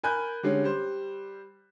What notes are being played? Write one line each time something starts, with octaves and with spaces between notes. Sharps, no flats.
A#4 G#5 B5 F#6 G6
D3 G3 G#3 C#4
G3 C5